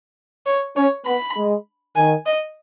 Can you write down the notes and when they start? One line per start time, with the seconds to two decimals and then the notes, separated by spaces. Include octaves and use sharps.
0.46 C#5
0.76 C#4 C#5
1.06 B3 B5
1.36 G#3
1.96 D#3 G#5
2.26 D#5